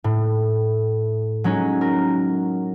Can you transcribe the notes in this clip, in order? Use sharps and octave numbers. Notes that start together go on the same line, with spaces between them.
A2
F#3 G#3 C#4 D#4 F#4
A#4